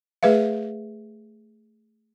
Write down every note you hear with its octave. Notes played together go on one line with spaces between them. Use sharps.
A3 G#4 B4 E5 F5